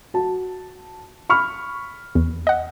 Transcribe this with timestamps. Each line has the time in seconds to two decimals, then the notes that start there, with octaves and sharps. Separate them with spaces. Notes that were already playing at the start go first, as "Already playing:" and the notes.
0.14 F#4 A5
1.30 B5 C#6 F6
2.15 E2
2.47 D#5 F#5